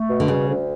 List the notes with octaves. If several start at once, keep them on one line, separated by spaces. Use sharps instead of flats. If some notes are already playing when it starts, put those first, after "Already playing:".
Already playing: A3
B2
D3
C#3 G3
D2